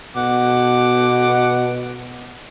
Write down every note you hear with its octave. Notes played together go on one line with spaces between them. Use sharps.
B2 F#5 D6